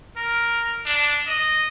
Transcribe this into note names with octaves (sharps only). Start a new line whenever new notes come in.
A#4
D4
D#5